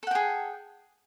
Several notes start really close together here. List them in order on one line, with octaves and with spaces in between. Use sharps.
A4 F#5 G5 G#4